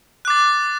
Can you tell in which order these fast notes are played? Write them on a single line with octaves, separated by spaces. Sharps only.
F#6 D6 A6